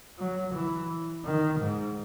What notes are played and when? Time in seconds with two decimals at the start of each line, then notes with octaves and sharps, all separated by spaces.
0.18 F#3
0.54 E3
1.25 D#3
1.60 G#2